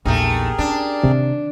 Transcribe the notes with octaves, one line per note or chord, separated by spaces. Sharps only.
A#1 E2 A3 D#4 G4 G#4 A#4
C#4 D4
C3 D#3